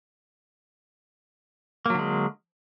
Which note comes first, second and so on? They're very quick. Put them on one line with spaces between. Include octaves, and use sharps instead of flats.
A#3 F#3 D3 G#3